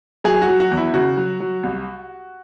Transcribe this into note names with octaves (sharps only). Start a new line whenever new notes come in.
F#3 G#4
F#4
F#3
F#4
E2
E4
C#3 F#4
F#3
F#3
C2